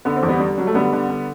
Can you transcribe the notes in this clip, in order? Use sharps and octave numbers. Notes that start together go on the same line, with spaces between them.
D3 B3
C4
E2
G3 B3
D3 G3
F#3 G3
A3
D3 G3 B3
D3
D3